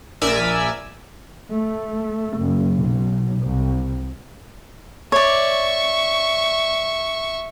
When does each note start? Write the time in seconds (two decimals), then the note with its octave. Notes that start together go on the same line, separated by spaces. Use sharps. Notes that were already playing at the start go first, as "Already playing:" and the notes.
0.22 A#1 A#4 D5 E5 G#5 E6
1.53 A3
2.40 F#1
2.79 B1
3.43 C2
5.12 C#5 D5 E5 C#6